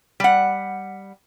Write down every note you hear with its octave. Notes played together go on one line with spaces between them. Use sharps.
G3 F#5